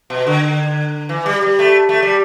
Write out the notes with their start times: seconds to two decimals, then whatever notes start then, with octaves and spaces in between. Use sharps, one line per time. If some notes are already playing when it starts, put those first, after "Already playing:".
0.10 B2
0.27 D3
1.09 E3
1.26 G3
1.42 G3
1.59 A3
1.89 A3
2.02 G3